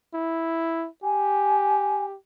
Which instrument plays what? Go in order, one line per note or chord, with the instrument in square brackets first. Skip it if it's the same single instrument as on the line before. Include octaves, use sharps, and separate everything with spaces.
[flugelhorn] E4
[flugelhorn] G4 [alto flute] G#5